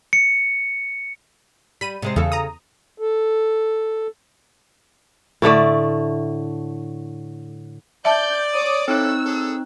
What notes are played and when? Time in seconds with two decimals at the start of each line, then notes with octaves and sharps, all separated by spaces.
0.13 C#7
1.81 G3 B5 D#7
2.02 C3 G#3 C5
2.16 E2 C#3 A4
2.32 A#5 D#6
2.98 A4
5.42 A2 D3 A3 D5
8.05 D5 E5 A5 G6
8.54 C#5 D6 D#6
8.88 C4 D#4 E4 A4 C#5 E6 F#6
9.26 G#4 A4